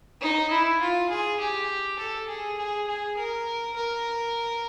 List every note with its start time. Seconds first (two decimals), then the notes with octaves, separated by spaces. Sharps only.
0.21 D#4
0.51 E4
0.80 F4
1.10 G#4
1.40 G4
1.99 A4
2.28 G#4
2.58 G#4
2.87 G#4
3.17 A#4
3.76 A#4